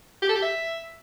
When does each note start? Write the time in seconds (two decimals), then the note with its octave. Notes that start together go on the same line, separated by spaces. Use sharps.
0.22 G4
0.29 A4
0.36 G4
0.42 E5